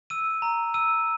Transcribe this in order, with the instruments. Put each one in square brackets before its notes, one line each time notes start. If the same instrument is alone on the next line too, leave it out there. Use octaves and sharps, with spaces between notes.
[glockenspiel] E6 D#7
A#5
E6 D#7